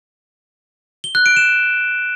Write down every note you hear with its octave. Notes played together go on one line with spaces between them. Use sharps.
G7
F#6
D7
E7